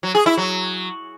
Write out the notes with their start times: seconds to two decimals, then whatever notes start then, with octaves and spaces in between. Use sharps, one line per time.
0.03 F#3
0.15 G#4
0.26 E4
0.38 F#3